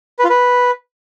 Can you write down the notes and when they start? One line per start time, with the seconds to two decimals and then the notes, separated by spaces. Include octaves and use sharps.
0.19 B4
0.24 F4
0.29 B4